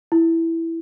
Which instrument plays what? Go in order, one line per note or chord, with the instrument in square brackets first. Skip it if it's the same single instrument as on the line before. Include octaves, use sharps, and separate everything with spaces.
[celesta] E4